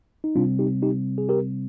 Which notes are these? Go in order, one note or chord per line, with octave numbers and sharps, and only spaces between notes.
D#4
C3 G3 C4 D4 F4
D#4 G4
D#4 G4
G#4
G4 A#4